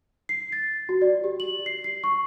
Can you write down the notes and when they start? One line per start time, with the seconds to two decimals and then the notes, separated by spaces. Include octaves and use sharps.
0.29 C7
0.52 A6
0.89 F#4
1.02 D5
1.24 G4
1.40 F#7
1.66 C7
1.84 C7
2.04 C#6